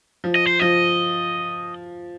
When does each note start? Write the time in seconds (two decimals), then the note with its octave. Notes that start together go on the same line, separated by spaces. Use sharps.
0.24 F3
0.35 D#5
0.47 C5
0.60 F3 D#5